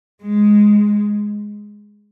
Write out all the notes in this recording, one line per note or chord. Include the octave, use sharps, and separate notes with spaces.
G#3